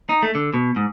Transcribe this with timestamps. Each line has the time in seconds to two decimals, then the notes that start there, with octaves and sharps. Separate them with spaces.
0.09 D#4
0.23 A3
0.35 D3
0.54 B2
0.76 G#2